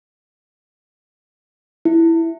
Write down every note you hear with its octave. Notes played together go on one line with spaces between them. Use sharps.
E4